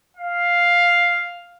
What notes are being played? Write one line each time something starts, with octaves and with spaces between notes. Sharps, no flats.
F5